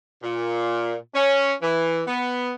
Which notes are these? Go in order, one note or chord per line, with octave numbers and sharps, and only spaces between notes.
A#2
C#4
E3
B3